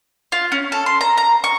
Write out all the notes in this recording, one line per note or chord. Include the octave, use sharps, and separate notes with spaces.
F4
C#4
A4
C6
A#5
A#5
C#6